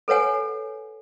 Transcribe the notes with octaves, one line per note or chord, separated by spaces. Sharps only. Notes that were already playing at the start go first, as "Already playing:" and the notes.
A4 B4 C#5 F#5 G#5